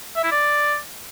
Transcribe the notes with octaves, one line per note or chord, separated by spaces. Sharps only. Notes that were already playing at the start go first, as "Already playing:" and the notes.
E5
E4
D5